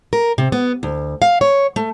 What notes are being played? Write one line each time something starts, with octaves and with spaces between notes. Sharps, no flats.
A#4
C3
B3
D2
F5
C#5
A3